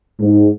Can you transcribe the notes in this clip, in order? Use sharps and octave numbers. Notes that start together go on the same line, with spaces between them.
G#2